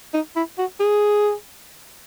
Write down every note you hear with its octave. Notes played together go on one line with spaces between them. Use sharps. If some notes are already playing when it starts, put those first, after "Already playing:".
D#4
E4
F#4
G#4